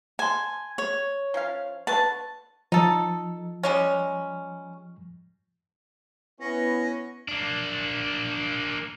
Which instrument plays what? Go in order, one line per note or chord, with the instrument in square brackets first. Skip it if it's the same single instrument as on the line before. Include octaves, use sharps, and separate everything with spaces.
[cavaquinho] G#5 [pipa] A5 C6
[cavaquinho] C#5
[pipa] F3 C#4 F5
[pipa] D3 B4 C#6 [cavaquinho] A5
[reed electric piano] F3 [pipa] D#4 A4
[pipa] G3 G#3 C#4
[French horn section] B3 E4 [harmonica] C#4 [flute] B4 [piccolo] A#6
[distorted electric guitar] A#3 D4